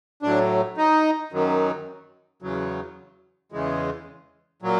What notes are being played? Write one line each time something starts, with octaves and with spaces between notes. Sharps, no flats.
A2 F#3 D4
D#4
F#2 D#3 F#3
E2 C#3 F#3
E2 C#3 E3 G#3
A#2 F#3